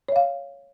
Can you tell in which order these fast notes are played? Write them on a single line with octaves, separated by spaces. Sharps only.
C#5 E5 F5